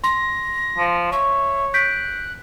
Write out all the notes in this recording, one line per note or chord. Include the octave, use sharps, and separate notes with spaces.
C6 A#6
F3
C#5 E5
F#6 G6 B6 D7